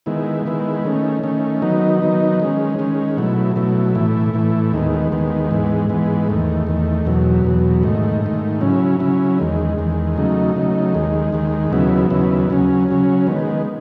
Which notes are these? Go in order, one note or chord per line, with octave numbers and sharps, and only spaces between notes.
D#3 G#3 B3 E4
D#3 G#3 B3 E4
D#3 A3 C#4
D#3 A3 C#4
D#3 F#3 B3 D#4
D#3 F#3 B3 D#4
D#3 G#3 C#4
D#3 G#3 C#4
B2 F#3 A3 E4
B2 F#3 A3 E4
A2 E3 A3 E4
A2 E3 A3 E4
D#2 D#3 G#3 B3
D#2 D#3 G#3 B3
G#2 E3 G#3 B3
G#2 E3 G#3 B3
E2 D#3 A3
E2 D#3 A3
E2 B2 F#3
E2 B2 F#3
G#2 D#3 A3
G#2 D#3 A3
C#3 F#3 C#4 E4
C#3 F#3 C#4 E4
E2 D#3 G#3
E2 D#3 G#3
C#3 F#3 A3 D#4
C#3 F#3 A3 D#4
D#2 D#3 G#3
D#2 D#3 G#3
D#2 C#3 F#3 B3 E4
D#2 C#3 F#3 B3 E4
C#3 F#3 C#4
C#3 F#3 C#4
D#3 G#3 B3